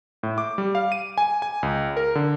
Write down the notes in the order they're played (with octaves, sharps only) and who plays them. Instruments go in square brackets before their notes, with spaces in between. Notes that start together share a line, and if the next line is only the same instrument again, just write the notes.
[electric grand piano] A2
D6
G3
F5
D#7
G#5
G#5
C#2
A#4
D3